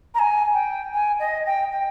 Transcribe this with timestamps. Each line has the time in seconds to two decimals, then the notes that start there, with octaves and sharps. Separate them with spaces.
0.14 A#5
0.19 G#5
0.53 G5
0.93 G#5
1.19 D#5
1.46 G5
1.72 G5